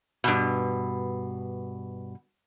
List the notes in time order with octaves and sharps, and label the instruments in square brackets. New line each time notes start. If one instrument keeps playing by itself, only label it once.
[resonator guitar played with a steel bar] G2 B2